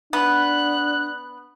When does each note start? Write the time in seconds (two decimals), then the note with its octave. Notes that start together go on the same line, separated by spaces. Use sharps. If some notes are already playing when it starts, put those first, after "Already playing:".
0.13 B3 D4 F#6